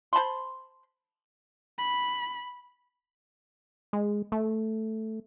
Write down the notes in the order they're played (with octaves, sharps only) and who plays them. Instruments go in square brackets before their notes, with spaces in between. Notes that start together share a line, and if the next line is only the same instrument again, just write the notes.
[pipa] C5 A5 B5 C6
[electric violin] B5
[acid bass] G#3
A3